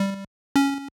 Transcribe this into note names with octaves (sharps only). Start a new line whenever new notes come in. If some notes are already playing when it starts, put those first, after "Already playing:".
Already playing: G3
C#4